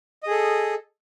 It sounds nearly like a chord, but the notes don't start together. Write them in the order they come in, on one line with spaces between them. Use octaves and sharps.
D#5 G#4 A4